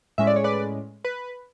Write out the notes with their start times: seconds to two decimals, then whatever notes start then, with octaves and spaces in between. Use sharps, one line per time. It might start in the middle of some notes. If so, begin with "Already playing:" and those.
0.18 A2 G#3 C#4 E5
0.27 D5
0.36 C#5
0.44 B4 D5
1.04 B4